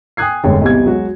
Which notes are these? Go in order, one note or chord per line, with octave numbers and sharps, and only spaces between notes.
G5 G#5 D#6 F#6 G#6 C7
F1 G2 D3 G#3 C#5 G5
B1 E2 C3 G3 G#6
F#3 G#3 F#4